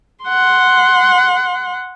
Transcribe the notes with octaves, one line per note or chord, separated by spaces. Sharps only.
F#5 C6